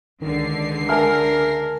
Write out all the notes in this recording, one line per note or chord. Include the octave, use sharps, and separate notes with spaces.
C#2 D3 D#3 C7
A#4 E5 G#5 A5 F6